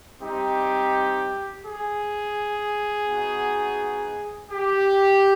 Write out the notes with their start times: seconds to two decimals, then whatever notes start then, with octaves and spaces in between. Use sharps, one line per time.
0.21 G3 C4 D#4 G4
1.64 G#4
3.07 B3 D#4 F#4
4.51 G4